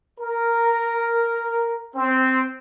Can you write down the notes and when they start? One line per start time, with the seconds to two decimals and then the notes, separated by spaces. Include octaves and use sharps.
0.19 A#4
1.96 C4